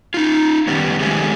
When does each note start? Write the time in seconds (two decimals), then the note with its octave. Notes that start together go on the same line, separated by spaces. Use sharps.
0.14 D#4 F4
0.67 D#3 G3 B3 C#4
1.00 D#3 G#3 A3 C4 G4 G#4